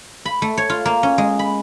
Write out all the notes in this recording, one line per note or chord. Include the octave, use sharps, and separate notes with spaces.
B5
A3
C#5
F4
A#3
C#4
G#3
B5